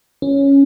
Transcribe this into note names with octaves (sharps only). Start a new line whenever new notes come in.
C#4